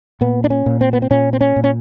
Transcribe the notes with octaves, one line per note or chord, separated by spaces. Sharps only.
A#2 B3
D4
C#4
A#2
C4
B3
C4
A#2 C#4
C4
C#4
A#2
C#4